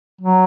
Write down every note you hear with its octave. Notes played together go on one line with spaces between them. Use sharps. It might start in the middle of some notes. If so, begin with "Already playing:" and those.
F#3